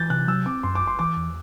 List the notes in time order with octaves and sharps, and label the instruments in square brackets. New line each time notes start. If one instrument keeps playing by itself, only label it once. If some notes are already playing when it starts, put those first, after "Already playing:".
Already playing: [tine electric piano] E3 [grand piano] G6 A6
[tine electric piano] C3 [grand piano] F#6
[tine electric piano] F#3 [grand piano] E6
[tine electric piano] C4 [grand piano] D6
[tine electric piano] F#2 [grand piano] C6
[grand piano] D6
[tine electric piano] G1
[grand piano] C6
[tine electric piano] E3 [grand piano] D6
[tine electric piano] E2